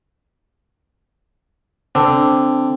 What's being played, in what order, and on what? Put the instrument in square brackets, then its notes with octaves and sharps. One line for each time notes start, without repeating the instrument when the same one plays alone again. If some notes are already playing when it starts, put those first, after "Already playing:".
[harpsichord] D3 [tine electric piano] C4